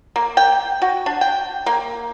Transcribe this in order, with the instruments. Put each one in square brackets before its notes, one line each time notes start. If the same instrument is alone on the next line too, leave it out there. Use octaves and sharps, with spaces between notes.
[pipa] A#3
G5
F#4
D4
G5
A#3